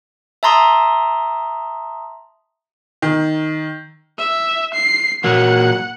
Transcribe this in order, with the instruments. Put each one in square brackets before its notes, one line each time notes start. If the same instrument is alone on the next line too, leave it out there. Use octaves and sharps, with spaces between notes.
[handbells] E5 A5 A#5 C6 D#6
[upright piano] D#3
[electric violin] E5
C7
[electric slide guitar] A#2 F#3 A#3 [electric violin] F#5